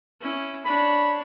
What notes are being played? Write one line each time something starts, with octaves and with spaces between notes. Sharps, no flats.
C#4 E4
D4 C#5 B5